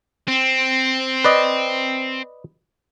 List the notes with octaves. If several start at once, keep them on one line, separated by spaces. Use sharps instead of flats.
C4
B4 D5 D#5